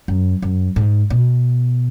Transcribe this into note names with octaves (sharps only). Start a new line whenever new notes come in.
F#2
F#2
G#2
B2